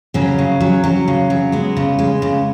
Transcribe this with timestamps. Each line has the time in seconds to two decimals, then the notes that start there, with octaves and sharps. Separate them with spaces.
0.14 C#3 F#3 C#4
0.38 C#3
0.60 F#3
0.84 F#3
1.08 C#3
1.30 F#3
1.52 G#3 B3
1.77 C#3
1.99 G#3
2.22 C#3